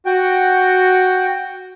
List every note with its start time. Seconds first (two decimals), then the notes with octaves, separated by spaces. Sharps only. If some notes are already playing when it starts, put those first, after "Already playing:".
0.06 F#4 G5